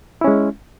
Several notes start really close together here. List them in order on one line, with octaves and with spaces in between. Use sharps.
E4 C#4 G#3